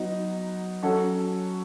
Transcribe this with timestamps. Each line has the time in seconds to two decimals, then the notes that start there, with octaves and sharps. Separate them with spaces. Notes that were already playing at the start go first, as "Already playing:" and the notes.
Already playing: F#3 B3 D#4
0.83 F#3 C#4 F#4 A4